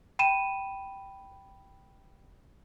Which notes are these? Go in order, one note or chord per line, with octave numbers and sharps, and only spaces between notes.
G5 B5 D#7 E7